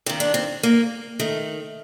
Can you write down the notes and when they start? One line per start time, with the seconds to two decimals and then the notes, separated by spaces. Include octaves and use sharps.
0.06 G2 D#3 C4
0.20 D4
0.34 C4
0.63 A#3
1.20 D#3 A3